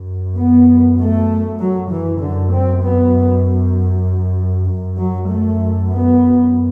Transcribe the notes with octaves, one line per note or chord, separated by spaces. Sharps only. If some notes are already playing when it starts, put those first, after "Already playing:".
Already playing: F#2
B3
A3
F#3
E3
F#2 D3
C4
B3
F#2
F#3
A3
B3